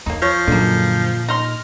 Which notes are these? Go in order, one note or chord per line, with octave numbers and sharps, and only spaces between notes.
E2 A#3 D#4
F3 C#5
F#2 A#2 D3 G#3 A#3
D#4 C6 F6 A#6